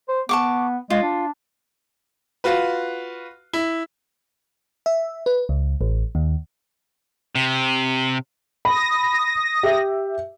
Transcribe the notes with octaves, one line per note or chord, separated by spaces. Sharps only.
C5
B3 A5 C#6 D6
G#3 F4
D4
F4 F#4 B4
E4
E5
B4
C#2
A1
D#2
C3
B5 D#6 A#6
G4 E5